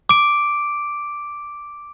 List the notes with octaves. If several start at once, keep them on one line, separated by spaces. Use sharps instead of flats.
D6 D7